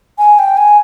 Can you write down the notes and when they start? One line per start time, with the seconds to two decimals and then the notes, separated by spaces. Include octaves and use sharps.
0.18 G#5
0.39 G5
0.57 G#5